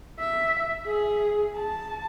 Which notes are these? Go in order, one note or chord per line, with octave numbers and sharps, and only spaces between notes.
E5
G#4
A5